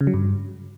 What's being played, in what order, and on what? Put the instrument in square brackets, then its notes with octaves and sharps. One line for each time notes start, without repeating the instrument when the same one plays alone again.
[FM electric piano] C#3
F#3
G2